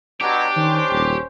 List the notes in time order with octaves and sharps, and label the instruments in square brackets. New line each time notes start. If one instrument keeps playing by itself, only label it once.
[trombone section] B2 F#3 [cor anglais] D4 [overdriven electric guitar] G4
[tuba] D#3 [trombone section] C#4 C5
[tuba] D#1